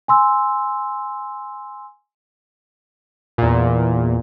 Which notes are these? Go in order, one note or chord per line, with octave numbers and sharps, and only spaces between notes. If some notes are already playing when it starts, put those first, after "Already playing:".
G#5 C6 E6
E2 A#2